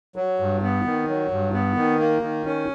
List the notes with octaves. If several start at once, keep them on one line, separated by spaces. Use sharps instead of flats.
F#3
G2
B3
D#3
F#3
G2
B3
D#3
A#3
D#3
C#4